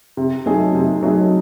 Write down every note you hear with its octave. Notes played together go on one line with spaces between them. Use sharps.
C3
F#3 A3 D#4 G#4
C3
F#3 A3 D#4 G#4